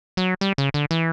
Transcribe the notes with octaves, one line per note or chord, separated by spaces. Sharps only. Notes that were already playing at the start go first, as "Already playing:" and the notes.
F#3
G3
C#3
D3
E3